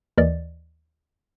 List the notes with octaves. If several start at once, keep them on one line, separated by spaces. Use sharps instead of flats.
D#2 E3 A#4 D5 D#5 A6